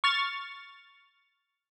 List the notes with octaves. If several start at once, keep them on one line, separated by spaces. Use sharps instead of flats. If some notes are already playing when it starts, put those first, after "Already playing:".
C#6 F6 A6